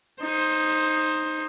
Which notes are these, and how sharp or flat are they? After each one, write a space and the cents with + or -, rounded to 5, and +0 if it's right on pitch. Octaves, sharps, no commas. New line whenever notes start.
D#4 +0 C5 +15